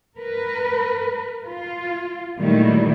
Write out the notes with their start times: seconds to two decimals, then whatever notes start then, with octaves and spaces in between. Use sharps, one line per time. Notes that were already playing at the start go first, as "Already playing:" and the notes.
0.18 A#4 B4
1.47 F4
2.39 A#2 D#3 F#3 G3 A3 E4